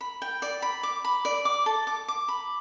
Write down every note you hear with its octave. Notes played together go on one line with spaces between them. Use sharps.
B5
G5
D5
B5
D6
B5
D5
D6
A4
D6
D6
B5